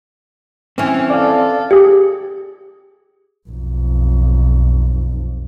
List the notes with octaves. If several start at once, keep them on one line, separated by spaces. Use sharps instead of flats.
E3 C4 C#4
A4 D5 F5
G4 G#4
B1 F2